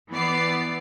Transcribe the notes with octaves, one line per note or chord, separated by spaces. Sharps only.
E3 B3 D5 C7